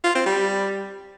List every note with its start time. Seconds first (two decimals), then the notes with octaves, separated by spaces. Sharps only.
0.04 F4
0.15 C4
0.26 G3